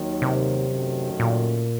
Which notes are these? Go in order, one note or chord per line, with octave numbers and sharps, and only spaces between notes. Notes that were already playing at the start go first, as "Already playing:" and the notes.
Already playing: D#2 D#3 F#3
C3
F#2 D#3 A3 C#4 F#4
A#2